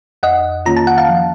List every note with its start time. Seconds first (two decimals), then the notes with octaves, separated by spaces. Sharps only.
0.23 F2 D#5 F#5
0.66 D#3 A#3 C#4 F4 A#5
0.77 A5
0.87 F#5
0.98 F5 A5
1.09 F3